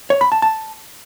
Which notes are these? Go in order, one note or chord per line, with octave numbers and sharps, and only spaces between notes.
C#5
B5
A5
A5